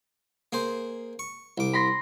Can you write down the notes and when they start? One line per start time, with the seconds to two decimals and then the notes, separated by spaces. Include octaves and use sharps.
0.53 A#3 G#4 C5
1.19 C#6
1.58 C2 D6
1.73 B5 C6 A#6